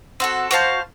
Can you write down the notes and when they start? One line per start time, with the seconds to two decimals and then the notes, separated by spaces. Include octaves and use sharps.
0.20 C4 F#4 A4
0.51 F#4 C5 F5 A5